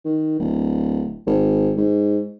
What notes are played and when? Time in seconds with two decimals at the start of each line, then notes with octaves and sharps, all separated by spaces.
0.05 D#3
0.39 D1
1.27 G#1
1.77 G#2